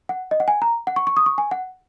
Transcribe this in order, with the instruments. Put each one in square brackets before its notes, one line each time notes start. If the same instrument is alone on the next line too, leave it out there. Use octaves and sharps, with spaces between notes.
[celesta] F#5
D#5
F#5
G#5
A#5
F#5
C#6
C#6
D#6
C#6
G#5
F#5